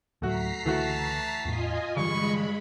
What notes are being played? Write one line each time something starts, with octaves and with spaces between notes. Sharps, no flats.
D2 A2 F#3 A3 F#4 A#5 B6 C7
C#2 D3 E3 A3 F#4 A5
E2 A2 F4 D#5 G#5
G2 D3 E3 G#3 B5 C#6